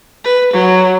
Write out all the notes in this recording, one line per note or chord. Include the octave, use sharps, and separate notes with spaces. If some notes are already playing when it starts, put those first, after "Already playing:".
B4
F#3